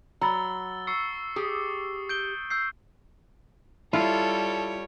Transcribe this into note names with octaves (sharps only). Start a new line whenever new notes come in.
F#3 A#5 B5 E6 A6 G7
C#6 E6 C7 C#7
G4 G#4 D#6
G6 D7 G7
E6 G6 C7
G3 E4 F4 A4 C#5